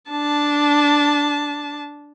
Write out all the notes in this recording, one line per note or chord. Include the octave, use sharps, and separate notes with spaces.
D4 A5